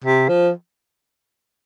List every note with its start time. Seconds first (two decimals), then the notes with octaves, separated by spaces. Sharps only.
0.04 C3
0.29 F3